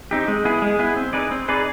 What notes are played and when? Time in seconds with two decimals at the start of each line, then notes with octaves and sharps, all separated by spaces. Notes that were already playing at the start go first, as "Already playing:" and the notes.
0.11 C4 D#4 G4
0.28 G#3
0.45 B3 E4 G#4
0.62 G#3
0.79 B3 E4 G#4
0.96 C4
1.13 D#4 G#4 B4 D5
1.31 C4
1.48 D#4 G#4 B4 D5